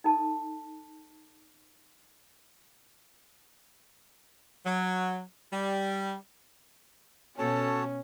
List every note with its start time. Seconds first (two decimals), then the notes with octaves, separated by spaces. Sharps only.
0.04 D#4 A4 A5
4.65 F#3
5.52 G3
7.38 B2 C#4 F#4 A4 C#5 A5